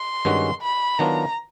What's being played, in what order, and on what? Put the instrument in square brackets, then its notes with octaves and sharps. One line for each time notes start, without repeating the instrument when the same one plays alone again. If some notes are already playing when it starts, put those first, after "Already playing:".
Already playing: [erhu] C6
[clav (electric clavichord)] G2 D#3 G#3 C#4 F#4
[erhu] B5
[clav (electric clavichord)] D#3 F#3 B3 D4 F4 [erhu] A#5